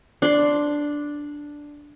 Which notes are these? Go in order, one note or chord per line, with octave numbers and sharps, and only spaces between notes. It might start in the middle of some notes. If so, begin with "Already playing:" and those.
D4 D5 C6